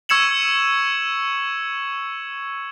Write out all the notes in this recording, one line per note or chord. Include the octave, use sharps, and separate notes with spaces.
C#6 E6 G#6 C#7 E7 F#7